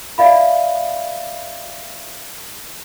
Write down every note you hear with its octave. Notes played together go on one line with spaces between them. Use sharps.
D5 E5 F5 B5